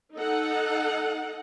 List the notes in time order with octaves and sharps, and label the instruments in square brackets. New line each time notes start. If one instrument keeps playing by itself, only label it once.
[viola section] D#4 A4 F#5